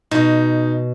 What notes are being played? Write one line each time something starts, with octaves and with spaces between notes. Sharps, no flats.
B2 D#4